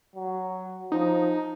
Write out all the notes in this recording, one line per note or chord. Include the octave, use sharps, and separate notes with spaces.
F#3
F3 D#4